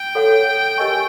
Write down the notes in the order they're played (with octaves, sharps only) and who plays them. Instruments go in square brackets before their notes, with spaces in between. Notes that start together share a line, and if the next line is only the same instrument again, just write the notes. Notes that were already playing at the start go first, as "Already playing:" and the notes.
Already playing: [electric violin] G5
[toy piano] A4 C#5 F#5
G4 A#4 D#5 G#5 C#6